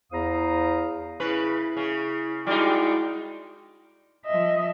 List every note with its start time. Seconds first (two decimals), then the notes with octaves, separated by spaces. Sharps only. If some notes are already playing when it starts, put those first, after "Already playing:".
0.12 E2 E4 C5 F5 A#5 D#6
1.20 C#3 E4 B4
1.77 C#3
2.46 G3 G#3 D#4 E4 F#4 D5
4.26 F3 D#5 E5